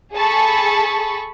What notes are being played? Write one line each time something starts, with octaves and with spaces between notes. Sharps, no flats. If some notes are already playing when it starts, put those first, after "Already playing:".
G#4 A4 A5 B5 C#6